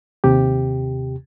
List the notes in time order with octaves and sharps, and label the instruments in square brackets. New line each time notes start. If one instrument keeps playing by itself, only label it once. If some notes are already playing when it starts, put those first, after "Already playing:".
[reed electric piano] D#2 C3 G4